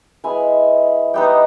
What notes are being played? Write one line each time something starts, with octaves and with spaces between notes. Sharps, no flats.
G#3 B3 E4 G#5
G3 B3 D#4 G5